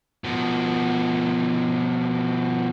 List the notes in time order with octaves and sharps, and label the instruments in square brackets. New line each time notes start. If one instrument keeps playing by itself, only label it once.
[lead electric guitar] B2 F3